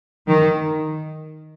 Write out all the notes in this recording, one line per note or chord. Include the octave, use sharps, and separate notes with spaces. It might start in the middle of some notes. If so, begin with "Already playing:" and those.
D#3